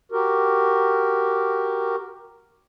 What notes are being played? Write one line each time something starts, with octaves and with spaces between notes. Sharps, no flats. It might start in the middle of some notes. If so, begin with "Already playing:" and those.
F#4 G4 A#4